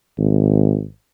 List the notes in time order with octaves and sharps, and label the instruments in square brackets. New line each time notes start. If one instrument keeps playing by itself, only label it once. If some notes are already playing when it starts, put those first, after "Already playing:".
[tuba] G#1